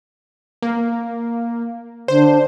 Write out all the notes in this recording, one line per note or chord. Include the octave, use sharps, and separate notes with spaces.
A#3
D3 C5